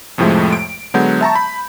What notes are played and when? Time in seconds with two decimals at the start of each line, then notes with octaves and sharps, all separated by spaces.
0.18 F2 A2 C3 F3 G#3 A3
0.53 D7
0.94 D3 F#3 G#3 B3 F#5 G6
1.21 E5 A5 A#5 C#6
1.36 B5